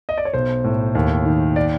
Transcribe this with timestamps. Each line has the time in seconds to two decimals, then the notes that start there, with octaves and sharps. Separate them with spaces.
0.09 D#5
0.18 D5
0.25 C#5
0.34 B1 C5
0.64 A2
0.95 D#2
1.26 D#3
1.56 D5